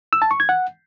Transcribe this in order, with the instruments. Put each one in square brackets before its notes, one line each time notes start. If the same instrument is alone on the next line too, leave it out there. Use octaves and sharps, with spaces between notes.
[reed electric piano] E6
A5
C#6
G#6
F#5